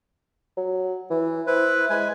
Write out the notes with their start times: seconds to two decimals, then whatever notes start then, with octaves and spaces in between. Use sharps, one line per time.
0.57 F#3
1.10 E3
1.47 E4 B4 C5
1.90 G#3 B4 G#5